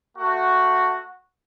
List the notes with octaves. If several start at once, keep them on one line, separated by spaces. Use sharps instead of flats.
A3 F#4